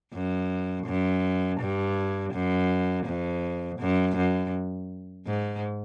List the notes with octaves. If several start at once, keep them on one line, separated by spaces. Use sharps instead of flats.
F#2
F#2
G2
F#2
F2
F#2
F#2
G#2